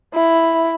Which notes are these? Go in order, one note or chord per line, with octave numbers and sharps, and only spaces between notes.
E4